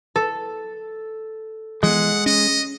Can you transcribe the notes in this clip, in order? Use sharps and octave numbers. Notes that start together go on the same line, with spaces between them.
A4
E3 G#3 B3 F#5
C#4 D#5